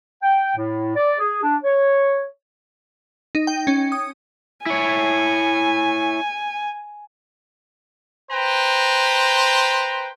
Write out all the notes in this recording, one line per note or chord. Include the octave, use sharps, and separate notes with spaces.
G5
A2
D5
G#4
D4
C#5
D#4
G5
C#4
D#6
E4 C#5 G#5
B4 C5 G5 A#5